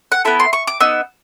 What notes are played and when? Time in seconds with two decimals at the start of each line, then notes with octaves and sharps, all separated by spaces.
0.12 F#5
0.25 B3 E4 A4 B5
0.40 C6
0.53 C#6
0.67 D6
0.80 B3 D#4 E6